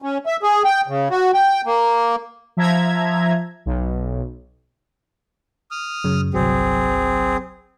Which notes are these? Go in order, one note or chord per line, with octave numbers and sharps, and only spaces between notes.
C#4
E5
G#4
G5
C#3
F#4
G5
A#3
F3 E5 A#5 G#6
B1
D#6 F6
F#2 C#3
G1 C2 F#3 C4 G#4